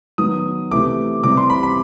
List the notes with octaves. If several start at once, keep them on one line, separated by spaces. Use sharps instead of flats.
D#3 F#3 B3 D#6
C3 E3 A3 D6
C3 E3 G3 D6
C6
B5
B5